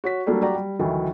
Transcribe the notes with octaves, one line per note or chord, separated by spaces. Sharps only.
F#4 C#5 B6
F#3 G3 A3 A#3 D4 G4
F#4 G4 D5 G5 A#5
G3
D2 D#3 E3 F#3